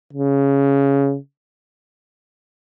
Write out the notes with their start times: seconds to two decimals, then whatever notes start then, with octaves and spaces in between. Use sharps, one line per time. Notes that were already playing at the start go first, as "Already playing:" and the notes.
0.13 C#3